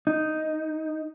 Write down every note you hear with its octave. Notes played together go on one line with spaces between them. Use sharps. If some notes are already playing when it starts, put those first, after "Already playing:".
D#4